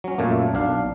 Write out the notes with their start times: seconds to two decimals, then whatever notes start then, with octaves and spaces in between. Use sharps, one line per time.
0.04 F#3 C#4
0.18 F#2 A#2 A3 A#3
0.54 B1 D4 F5